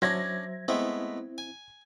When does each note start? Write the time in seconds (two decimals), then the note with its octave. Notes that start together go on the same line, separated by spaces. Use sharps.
0.02 F#3 C#4 D4 C5 E5 A5 G#6 A#6
0.68 G#3 A3 B3 C4 E4
1.38 G#5